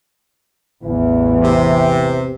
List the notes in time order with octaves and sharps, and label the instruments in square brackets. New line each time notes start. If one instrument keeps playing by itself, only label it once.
[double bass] A1 E2 [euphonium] E3
[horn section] C3